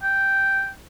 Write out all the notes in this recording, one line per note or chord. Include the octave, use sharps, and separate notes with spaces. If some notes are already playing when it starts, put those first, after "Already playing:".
G5